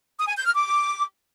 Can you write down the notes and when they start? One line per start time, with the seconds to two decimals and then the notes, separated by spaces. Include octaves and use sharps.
0.18 D#6
0.27 G#5
0.36 G6
0.45 F6
0.54 D6